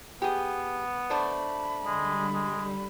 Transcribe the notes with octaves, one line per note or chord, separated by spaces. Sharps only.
B3 G4 G#4
A3 D4 C5 B5
D3 G3 G#3
G#3